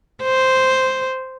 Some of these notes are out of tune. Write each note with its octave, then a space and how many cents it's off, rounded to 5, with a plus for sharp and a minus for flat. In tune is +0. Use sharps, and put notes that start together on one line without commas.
C5 -5